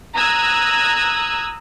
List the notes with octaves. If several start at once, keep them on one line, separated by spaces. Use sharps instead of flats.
A#5 D#6 E6 F#6 G#6